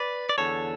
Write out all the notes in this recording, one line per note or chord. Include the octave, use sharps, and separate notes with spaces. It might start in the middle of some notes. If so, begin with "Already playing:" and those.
Already playing: B4 D5
D5
E2 D3 A4 C#5